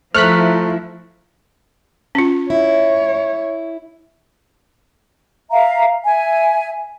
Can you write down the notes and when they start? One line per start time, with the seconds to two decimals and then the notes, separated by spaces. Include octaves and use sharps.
0.15 F3 A3 E4 C5 A#5 F6 F#6 B6
2.15 C#4 F4
2.50 E4 C#5
5.51 E5 F5 A#5
6.04 E5 G#5